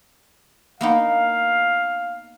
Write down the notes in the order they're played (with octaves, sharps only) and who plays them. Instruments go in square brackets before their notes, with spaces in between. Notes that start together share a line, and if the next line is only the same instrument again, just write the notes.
[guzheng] A#3 B3 D#4 [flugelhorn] F5